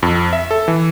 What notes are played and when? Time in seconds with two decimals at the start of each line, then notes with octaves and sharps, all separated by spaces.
0.03 F2
0.33 E5
0.51 A4
0.68 E3